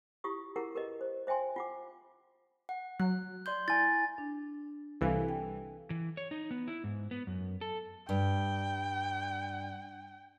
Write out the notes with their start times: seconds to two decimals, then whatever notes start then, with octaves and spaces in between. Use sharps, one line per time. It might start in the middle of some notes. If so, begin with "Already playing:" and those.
0.24 E4 F4 G4 C#6 D#6
0.56 E4 F4 G#4 A#4 F#5
0.75 G4 A#4 B4 D#5
1.01 C5
1.27 C5 E5 G5 G#5 C6
1.56 F4 F#5 D6
2.69 F#5
3.00 F#3 F#6
3.46 D5 C6 G6
3.68 E4 G#5 A6
4.18 D4
5.01 C2 E3 A4 F5 G#5
5.29 G5
5.90 E3
6.17 C#5
6.31 D#4
6.51 B3
6.68 E4
6.84 G#2
7.11 B3
7.27 F#2
7.61 A4
8.09 G2 G5